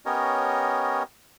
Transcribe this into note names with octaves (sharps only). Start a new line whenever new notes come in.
B3 C#4 G4 A#4 C#5 D#5